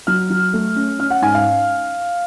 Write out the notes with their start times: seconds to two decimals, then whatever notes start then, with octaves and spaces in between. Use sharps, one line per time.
0.07 F#3 F6
0.30 F#3
0.53 A3
0.76 C#4
0.99 C#4 F6
1.10 F#5
1.22 G#2 G#5
1.34 F5